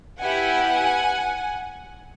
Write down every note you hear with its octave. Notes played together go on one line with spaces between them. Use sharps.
B3 E4 G4 F#5 G#5